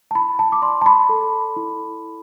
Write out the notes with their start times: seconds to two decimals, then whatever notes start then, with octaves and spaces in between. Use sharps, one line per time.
0.11 A5
0.15 E4 B5
0.39 A5
0.52 D6
0.62 D5 C6
0.82 A5
0.86 B5
1.09 A4
1.56 E4